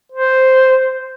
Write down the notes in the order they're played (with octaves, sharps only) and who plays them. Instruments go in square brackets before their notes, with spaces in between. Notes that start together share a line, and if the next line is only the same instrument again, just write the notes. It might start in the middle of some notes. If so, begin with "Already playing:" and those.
[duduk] C5